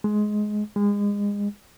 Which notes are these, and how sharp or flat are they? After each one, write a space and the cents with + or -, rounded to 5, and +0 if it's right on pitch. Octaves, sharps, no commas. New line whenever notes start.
G#3 +15
G#3 -30